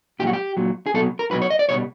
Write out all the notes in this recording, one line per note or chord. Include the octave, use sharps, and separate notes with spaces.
A#2 F#3 F#4 G4
G4
A#2 F#3
G#4
B2 F#3 A4
A#4
B2 F#3 B4
C#5
D#5
D5
B2 G3 C#5